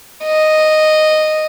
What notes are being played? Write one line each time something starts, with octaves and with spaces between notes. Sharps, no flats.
D#5